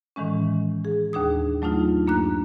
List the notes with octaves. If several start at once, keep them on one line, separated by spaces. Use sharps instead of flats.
A2 D#3 E3 G#3 C#4
G#4
D#2 D4 G#4 D#6
F#3 A3 D4 D#4 F4
G2 A#3 D4 F#6